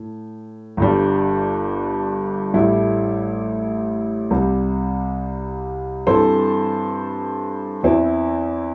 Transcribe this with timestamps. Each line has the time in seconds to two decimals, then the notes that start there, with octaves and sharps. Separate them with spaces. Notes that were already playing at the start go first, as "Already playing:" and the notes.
Already playing: A2
0.77 G1 G2 G3
2.54 A1 A2 G3 E4
4.30 C2 C3 G3
6.07 G2 E3 C4 A4 C5
7.83 E2 E3 C4 E4